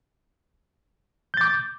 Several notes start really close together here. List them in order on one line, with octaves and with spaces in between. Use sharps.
G6 A6 D6